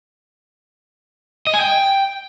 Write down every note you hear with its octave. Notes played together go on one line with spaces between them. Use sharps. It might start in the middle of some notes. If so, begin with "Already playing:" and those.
D#5
G#5
G5